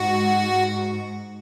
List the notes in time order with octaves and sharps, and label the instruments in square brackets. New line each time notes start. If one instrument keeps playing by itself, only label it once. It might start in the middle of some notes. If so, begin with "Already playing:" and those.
Already playing: [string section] G#2 [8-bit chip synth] F#4